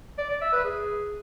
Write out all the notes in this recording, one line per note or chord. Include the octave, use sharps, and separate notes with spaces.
D5
D5
E5
B4
G#4